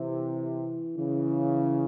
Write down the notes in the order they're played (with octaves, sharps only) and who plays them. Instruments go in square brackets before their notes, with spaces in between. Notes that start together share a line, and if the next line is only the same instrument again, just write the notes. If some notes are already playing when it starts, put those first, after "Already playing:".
Already playing: [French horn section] C3 [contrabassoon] E3
[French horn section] C#3 [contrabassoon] E3